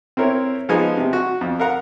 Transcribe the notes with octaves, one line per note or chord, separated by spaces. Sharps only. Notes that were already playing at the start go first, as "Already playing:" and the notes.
C4 E4 A#4 C#5
F3 G#3 B3 D#4 G#5
C3
F#4
F2
A#4 F5 F#5 A#5